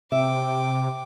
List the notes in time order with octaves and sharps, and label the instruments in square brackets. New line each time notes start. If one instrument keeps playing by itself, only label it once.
[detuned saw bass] C3 [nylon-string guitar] E5 [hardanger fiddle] G5 D6